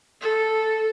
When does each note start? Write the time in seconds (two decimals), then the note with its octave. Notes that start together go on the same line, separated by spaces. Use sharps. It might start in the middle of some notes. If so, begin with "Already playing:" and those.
0.21 A4